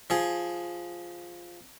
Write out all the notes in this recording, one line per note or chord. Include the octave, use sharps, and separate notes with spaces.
F3 G#4